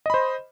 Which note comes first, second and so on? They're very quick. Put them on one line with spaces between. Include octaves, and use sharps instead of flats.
D#5 B5 C5